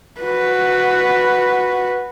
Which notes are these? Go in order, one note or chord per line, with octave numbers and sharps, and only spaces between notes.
F#4 B4